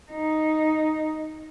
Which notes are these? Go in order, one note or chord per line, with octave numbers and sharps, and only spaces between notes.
D#4